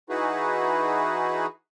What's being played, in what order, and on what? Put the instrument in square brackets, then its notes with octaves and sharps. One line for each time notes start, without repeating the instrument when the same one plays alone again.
[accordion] E3 D#4 E4 F#4 G#4 B4